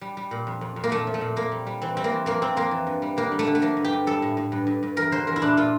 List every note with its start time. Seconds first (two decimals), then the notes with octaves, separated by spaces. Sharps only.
0.01 G3
0.17 G3
0.31 A#2
0.47 F2
0.61 F2
0.76 F2
0.84 A#3
0.91 A#2 A3
1.07 F3
1.14 A3
1.21 A#2
1.36 A#2 A#3
1.52 G3
1.67 G3
1.82 E3 C4
1.97 G3 C4
2.04 A#3
2.12 E3
2.26 F2 A#3
2.42 F2 C4
2.56 F2 A#3
2.71 E3
2.87 G2
3.02 G3
3.17 D3 A#3
3.32 G3
3.39 A3
3.47 D3
3.55 A3
3.62 F3 A#3
3.77 G2
3.84 G4
3.92 G2
4.07 G3 A4
4.22 A2
4.37 A2
4.52 G2
4.67 G2
4.83 G2
4.96 E2 A#4
5.11 D3 C5
5.27 E2 A#4
5.36 E4
5.42 A#2 D4
5.57 A#2 F4